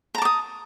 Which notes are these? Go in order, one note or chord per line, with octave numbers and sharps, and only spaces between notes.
A5 A#5 D6 D#6